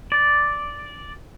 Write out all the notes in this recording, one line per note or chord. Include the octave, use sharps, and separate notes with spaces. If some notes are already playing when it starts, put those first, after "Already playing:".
D5